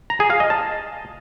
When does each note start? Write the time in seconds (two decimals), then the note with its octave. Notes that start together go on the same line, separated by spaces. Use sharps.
0.10 A#5
0.20 G#4
0.30 F5
0.40 D#5
0.50 A5